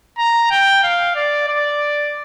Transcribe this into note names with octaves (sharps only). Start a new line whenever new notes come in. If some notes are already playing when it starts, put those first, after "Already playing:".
A#5
G5
F5
D5
D5